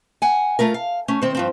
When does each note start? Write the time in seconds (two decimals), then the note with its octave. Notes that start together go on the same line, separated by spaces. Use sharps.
0.22 F#5 G#5
0.59 A3 F4 A#4
0.74 F5
1.08 A3 C#4
1.22 D#3 C4 C5
1.35 G2 F3 C4